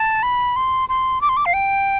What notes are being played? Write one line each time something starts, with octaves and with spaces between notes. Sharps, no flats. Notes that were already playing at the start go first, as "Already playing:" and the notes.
Already playing: A5
B5
C6
C6
D6
C6
D6
F5
G5